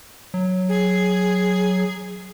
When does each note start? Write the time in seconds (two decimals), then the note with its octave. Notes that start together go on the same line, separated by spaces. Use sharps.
0.34 F#3
0.69 G#4